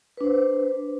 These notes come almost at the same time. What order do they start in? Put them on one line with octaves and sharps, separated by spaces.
B4 D4 C5